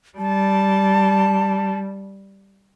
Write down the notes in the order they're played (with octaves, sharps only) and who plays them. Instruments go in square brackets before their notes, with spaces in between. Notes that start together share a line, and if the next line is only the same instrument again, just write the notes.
[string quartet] G3 [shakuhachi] A5